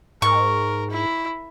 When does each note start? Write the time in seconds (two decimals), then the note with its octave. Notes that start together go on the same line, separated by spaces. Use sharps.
0.22 G#2 A#4 C#6
0.91 E4